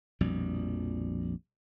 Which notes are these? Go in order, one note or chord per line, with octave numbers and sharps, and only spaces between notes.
A#1 F2 B2 G3